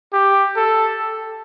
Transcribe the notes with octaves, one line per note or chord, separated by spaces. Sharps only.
G4
A4